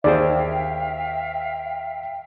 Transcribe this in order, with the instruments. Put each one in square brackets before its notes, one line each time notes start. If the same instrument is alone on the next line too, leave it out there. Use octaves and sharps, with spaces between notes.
[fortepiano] D#2 G#4 C5 [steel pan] D5 [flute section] E5 F5 G5